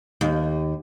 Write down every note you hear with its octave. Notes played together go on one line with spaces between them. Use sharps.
D#2